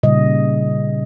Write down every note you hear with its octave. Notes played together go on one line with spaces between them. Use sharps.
A#2 C#3 G3 D#5